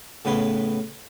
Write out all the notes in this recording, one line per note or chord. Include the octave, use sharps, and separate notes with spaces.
A2 C#3 B3 B4 C6 C#6